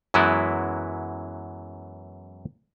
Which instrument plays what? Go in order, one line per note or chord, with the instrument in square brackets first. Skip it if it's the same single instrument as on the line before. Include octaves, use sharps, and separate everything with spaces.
[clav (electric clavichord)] F#2 E3 F#3 G#3 B3 E4